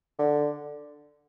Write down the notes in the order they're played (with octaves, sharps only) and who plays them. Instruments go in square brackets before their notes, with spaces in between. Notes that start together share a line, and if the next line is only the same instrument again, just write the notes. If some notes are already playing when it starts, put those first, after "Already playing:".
[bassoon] D3